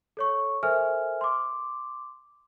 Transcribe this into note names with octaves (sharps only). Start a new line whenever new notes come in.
A4 C#5 C#6
A4 A#4 C5 E5 G#5 F6
C6 D6